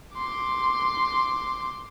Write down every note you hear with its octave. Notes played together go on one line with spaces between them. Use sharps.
C6 D6